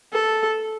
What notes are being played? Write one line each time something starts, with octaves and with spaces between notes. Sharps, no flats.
A4